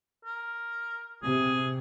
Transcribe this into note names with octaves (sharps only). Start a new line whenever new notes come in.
A#4
C3 G#4